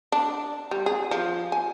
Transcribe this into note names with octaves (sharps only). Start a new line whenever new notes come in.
D4
G3
G#4
F3
G#5